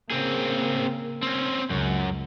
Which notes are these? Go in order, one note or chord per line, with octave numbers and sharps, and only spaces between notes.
C#3 A#3 C4 G#4
C4 C#4
C#2 F#2